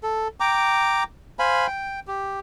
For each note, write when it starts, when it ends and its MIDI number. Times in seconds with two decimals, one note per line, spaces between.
0.03 0.28 69
0.40 1.04 79
0.40 1.04 82
0.40 1.04 86
1.39 1.67 72
1.39 1.67 77
1.39 1.67 80
1.39 1.67 83
1.67 2.00 79
2.07 2.40 67